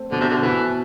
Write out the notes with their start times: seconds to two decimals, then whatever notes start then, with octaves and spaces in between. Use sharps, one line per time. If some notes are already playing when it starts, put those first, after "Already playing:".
Already playing: A3 C4
0.11 B2 D3
0.20 C3
0.30 D3
0.42 B2 E3